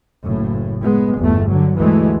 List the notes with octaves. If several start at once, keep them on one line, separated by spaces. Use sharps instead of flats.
F#1 A2
G#3 B3
G1 E2 A3
D3 F#3
D2 E3 G#3 A3